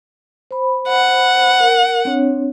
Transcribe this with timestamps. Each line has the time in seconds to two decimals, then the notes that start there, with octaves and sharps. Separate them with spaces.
0.51 C5 B5
0.89 F#5
1.60 A#4
2.05 C4 D4 C#5